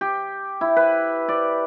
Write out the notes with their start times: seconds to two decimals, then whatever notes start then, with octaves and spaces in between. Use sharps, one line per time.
0.01 G4
0.61 E4
0.76 B4
1.28 D5